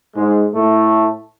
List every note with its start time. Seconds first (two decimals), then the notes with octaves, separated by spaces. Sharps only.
0.15 G#2 G#3
0.54 A2 A3